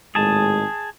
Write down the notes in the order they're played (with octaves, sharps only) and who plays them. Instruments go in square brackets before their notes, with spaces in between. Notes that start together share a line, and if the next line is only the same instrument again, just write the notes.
[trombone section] G#1 A2 G#3 [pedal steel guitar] G#4 A5